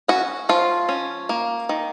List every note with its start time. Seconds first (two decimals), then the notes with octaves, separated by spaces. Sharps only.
0.08 C#4 F#4
0.49 F3 F4
0.89 C#4
1.29 A#3
1.69 D#3